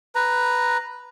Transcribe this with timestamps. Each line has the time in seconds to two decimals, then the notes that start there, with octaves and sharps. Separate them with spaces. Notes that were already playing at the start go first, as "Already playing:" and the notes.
0.15 B4 A#5